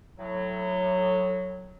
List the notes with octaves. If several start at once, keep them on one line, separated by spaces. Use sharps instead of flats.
A2 F#3